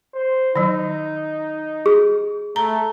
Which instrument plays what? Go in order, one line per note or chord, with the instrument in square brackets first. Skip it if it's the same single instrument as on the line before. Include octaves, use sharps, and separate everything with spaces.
[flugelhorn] C5
[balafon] D#3 F#3 [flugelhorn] D#4
[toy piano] G#4
[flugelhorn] A3 [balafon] A#5